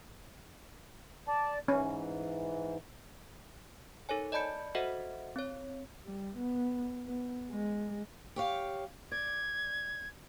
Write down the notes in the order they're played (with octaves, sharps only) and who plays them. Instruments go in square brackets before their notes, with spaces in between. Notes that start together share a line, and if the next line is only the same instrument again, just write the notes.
[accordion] D5 A5
[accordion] G#2 E3 [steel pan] C#4
[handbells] D#4 A4 A#4 C#5 G#5
D5 D#5 A5 B5 G6 C#7
F#4 A4 C5 D#5 E5 F#5
C4 C#5
[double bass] G3
B3
B3
G#3
[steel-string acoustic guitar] G4 C#5 F5
[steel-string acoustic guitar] D5 [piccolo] G#6